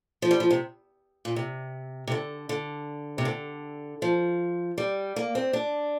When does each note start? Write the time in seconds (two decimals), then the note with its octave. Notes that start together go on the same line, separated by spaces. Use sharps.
0.22 F3
0.31 G3
0.40 F3
0.50 C3
1.25 A#2
1.36 C3
2.07 C3
2.12 D3
2.49 D3
3.18 C3
3.25 D3
4.02 F3
4.78 G3
5.16 A#3
5.35 C4
5.53 D4